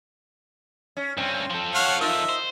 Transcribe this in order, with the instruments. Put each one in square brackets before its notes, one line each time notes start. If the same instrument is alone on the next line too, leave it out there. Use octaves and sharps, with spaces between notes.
[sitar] C#4
[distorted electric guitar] G2 C#4 [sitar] C4
[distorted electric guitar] F3 A4
[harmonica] C#5 F5 F#5
[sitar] D#4 F4 A#4 [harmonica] E5
[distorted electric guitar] C5